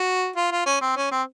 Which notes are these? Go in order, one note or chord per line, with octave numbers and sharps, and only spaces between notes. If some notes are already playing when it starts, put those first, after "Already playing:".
Already playing: F#4
F4
F4
C#4
C4
C#4
C4